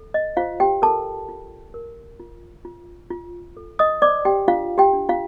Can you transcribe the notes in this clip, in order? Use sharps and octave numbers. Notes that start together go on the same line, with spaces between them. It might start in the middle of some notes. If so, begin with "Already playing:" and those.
Already playing: A4
D#5
F4 C5 F5
G4 G5
A4 A#4 A5
F4
A#4
F4
F4
F4
A4
D#5 D#6
C5 D5 D6
G4 G5
D4 F4 F5
G4 G5
D4
F4 F5